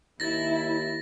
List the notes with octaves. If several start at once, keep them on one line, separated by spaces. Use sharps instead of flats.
D#2 E4 A6 A#6